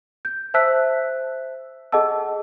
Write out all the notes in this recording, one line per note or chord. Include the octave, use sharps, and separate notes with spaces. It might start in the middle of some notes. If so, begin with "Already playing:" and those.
G6
C5 E5 A5 E6 F#6 B6
G#4 A4 D#5 F#5 A5 E6